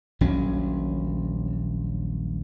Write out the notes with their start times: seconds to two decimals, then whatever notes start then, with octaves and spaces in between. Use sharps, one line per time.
0.21 D#1 A#1 F#3 C#4